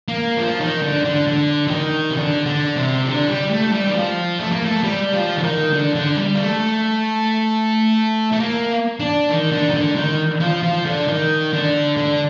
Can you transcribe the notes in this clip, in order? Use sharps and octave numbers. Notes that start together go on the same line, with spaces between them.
A#3
F3
D#3
D3
D3
D3
D3
D#3
C3
D3
D3
C3
D3
G3
A3
G3
D#3
F3
A3
A#3
A3
G3
F3
D3
D#3
D3
D3
G3
A#3
A3
A3
A#3
D4
D#3
D3
D#3
D3
D#3
F3
F3
D3
D#3
D3
D3